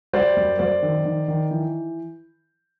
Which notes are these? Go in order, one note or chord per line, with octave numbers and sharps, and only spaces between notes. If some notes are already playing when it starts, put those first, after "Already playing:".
G3 C5 D5
F#2
F#2 C5 D5
D#3
D#3
D#3
E3